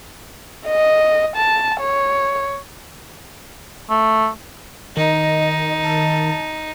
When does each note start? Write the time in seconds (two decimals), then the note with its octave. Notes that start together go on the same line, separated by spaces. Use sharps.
0.67 D#5
1.36 A5
1.80 C#5
3.90 A3
4.97 D#3 D#4 D#5
5.83 A5